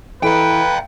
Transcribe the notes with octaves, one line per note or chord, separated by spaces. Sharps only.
E3 A4 B4 D#5 F5 G5 A#5